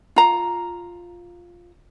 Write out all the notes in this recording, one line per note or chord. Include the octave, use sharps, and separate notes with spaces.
F4 A#5